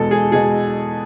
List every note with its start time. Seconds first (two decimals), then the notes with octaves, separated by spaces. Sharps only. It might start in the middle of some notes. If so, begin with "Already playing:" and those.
Already playing: E2 B2 G#3 A4
0.11 G#4
0.32 B2 G#3 G#4